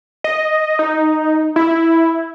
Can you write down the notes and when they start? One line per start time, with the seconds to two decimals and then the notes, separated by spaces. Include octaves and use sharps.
0.24 D#5
0.79 D#4
1.56 E4